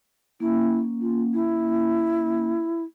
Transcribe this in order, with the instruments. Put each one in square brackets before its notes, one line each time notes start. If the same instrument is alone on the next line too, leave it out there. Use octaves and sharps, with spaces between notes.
[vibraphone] A#3 C#4 [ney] E4
[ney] F4
E4